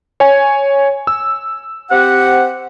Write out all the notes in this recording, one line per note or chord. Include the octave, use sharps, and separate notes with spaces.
C#5 G#5
E6
C4 G4 F#5